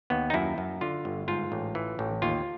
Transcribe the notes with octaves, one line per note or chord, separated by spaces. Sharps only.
D#2 B3
D#4
F#2 E4
F#2
D3 F4
G1
G#2 F4
A1
E3
A1
D#2 F4